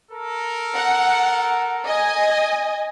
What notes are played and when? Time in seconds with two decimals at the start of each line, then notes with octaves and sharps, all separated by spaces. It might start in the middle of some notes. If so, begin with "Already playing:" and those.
0.12 A4 A#4
0.76 F#5
1.86 D#5 G#5